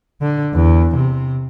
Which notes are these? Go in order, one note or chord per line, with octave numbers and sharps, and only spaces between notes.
D3
E2
C3